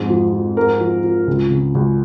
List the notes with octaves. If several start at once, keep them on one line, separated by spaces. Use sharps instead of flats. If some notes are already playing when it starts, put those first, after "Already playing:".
Already playing: F2 G#2
F3
F3
G#2 A#4
F3
F3
C#2
C#3
C#2